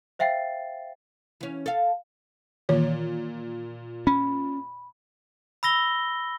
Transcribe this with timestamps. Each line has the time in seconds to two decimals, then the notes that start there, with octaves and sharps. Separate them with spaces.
0.19 C5 E5 F5 G5 A6 C7
1.41 E3 C#4
1.66 A4 F5
2.69 A#2 D#3 E3 C#5
4.07 C#4 B5
5.63 B5 E6 A#6 G7